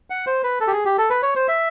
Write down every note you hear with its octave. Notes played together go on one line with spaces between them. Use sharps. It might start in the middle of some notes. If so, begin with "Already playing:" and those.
F#5
C5
B4
A4
G4
G#4
G4
A4
B4
C#5
C5
E5